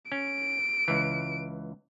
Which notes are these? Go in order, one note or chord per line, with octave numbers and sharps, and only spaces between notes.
C#4 D7
C#2 E3